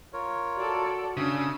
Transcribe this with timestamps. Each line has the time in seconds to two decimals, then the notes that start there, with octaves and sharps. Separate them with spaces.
0.13 F4 A#4 C#5
0.57 F#4 A4 D5
1.17 C#3 D4 E5 D#6 E6